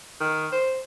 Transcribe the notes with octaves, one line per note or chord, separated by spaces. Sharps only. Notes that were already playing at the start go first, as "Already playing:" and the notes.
D#3
C5